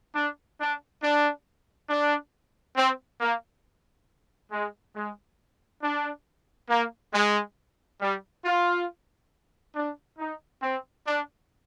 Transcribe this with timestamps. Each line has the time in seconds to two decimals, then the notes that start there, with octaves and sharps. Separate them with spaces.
0.15 D4
0.60 D4
1.03 D4
1.90 D4
2.77 C4
3.21 A#3
4.52 G#3
4.96 G#3
5.83 D4
6.70 A#3
7.14 G#3
8.01 G3
8.45 F4
9.76 D4
10.19 D#4
10.62 C4
11.06 D4